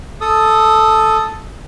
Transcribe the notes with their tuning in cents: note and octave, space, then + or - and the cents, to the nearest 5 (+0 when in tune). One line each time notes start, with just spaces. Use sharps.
A4 +0 D#6 +0